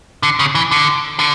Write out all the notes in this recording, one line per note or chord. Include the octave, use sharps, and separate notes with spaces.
D3
C#3
E3
D3
D3